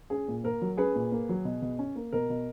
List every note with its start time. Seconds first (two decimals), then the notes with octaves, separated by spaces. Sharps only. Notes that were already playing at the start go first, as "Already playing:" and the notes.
0.10 C#4 G#4
0.28 A#2
0.44 A#3 A#4
0.62 F#3
0.77 C#4 G#4 B4
0.95 A#2
1.12 A#3
1.29 F#3
1.45 B2
1.62 B2
1.79 C#4
1.96 A#3
2.12 B2 A#4
2.30 B2